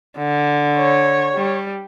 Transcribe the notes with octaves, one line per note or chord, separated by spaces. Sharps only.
D3
C#5
G3